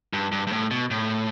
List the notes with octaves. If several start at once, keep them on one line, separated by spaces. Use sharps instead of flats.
G2
G2
G2
A2
B2
A2